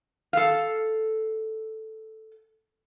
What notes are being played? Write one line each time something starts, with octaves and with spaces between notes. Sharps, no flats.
A4 F5